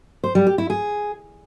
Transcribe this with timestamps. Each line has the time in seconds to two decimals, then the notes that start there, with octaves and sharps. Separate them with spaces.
0.24 C5
0.35 G3
0.47 G4
0.58 E4
0.70 G#4